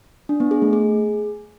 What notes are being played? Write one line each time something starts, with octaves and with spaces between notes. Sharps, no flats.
D4
B3
G#4
A3
G#4